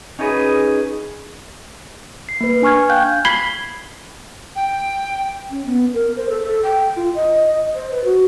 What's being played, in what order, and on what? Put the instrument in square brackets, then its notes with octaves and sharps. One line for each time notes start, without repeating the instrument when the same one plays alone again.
[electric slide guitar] C#4 D#4 F#4 G#4 B4
[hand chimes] C7
A#3 B4
D4 G#5 C#6 F6 G#6
F5 G5 F#6 G6
[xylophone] B5 G#6 B6 C7 F#7 G7
[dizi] G5
[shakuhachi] C#4
B3
A#4
C5
A4
A4
G5
F4
D#5
C5
B4
F#4